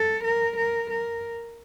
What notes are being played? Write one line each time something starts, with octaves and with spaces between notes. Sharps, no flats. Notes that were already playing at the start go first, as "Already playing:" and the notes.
Already playing: A4
A#4
A#4
A#4